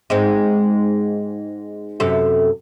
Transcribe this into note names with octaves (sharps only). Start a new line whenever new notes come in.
G#2 G#3 C4
F#2 C3 A4